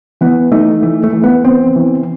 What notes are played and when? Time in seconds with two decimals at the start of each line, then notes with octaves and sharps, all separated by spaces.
0.21 E3 B3
0.52 A3 D#4
0.83 E3 A3
1.04 A3
1.13 E3
1.24 B3
1.45 B3 C4
1.76 E3